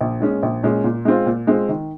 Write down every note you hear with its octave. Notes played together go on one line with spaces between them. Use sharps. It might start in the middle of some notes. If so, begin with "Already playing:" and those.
A#1
A#2 G#3 C#4
A#1
A#2 G#3 C#4
A#2
G#3 C4 F4
A#2
G#3 C4 F4
D#3